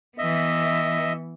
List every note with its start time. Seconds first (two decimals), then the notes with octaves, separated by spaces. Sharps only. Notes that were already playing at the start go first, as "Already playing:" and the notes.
0.18 E3 B3 D#5 E5